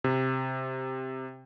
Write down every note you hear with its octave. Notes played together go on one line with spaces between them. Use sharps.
C3